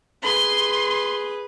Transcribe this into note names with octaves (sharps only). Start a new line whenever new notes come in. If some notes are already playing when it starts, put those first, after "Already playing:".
G#4 B4 C6